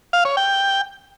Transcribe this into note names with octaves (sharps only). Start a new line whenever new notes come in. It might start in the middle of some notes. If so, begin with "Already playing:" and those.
F5
C#5
G5